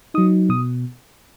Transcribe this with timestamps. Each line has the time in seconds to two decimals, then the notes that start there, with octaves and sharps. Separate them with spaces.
0.14 F#3 D#4 D#6
0.49 B2 D#6